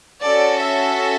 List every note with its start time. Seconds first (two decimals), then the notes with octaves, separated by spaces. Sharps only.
0.22 C#4 F#4 A4 D5
0.62 E5